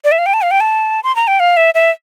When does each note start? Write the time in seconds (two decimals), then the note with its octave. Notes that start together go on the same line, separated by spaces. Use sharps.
0.04 D5
0.12 E5
0.19 F5
0.26 G5
0.34 A5
0.42 F5
0.51 G5
0.60 A5
1.04 C6
1.16 A#5
1.28 G5
1.40 F5
1.57 E5
1.74 E5